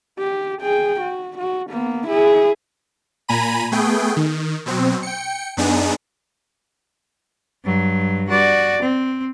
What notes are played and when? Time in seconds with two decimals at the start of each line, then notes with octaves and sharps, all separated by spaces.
0.19 G4
0.62 G#4 G5
1.01 F#4
1.38 F#4
1.71 A#3 B3
2.08 E4 G#4
3.28 A#2 G#5 A#5 B5 D#7
3.72 A3 B3 G#4 G5
4.16 D#3
4.66 B2 F#3 C4
5.03 G5 C#7
5.57 F#2 B3 D4 D#4 G#4
7.64 G2 F#3
8.29 F#4 D5
8.82 C4